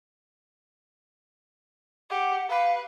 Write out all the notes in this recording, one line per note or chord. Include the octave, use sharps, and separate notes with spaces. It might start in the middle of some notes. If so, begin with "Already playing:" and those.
G4 F#5
B4 F5